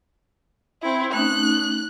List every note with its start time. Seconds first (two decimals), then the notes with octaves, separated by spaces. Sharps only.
0.82 C4 E4
1.13 A3 C#4 D#4 F#6